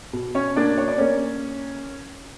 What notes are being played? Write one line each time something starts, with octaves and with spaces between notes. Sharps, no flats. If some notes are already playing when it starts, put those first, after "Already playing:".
B2
C#4 C#5
A#3 D4 D5
C#5
D5
A#3 C#4 C#5